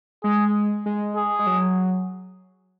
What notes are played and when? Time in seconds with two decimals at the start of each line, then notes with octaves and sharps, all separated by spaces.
0.24 G#3 G#4
0.86 G#3
1.17 G#4
1.39 G#3
1.46 F#3